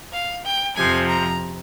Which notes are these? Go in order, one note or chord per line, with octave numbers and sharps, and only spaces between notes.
F5
G5
F2 C3 F3 G#5
A#5